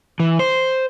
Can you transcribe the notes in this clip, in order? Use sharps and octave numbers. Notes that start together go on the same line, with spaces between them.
E3
C5